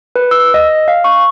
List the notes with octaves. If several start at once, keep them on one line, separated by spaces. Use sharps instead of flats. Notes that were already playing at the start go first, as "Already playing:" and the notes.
B4
E6
D#5
F5
C#6